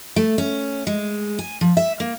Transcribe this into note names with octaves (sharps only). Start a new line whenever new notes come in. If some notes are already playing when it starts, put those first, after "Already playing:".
A3
C#4
G#3
G#5
F3
E5
A#3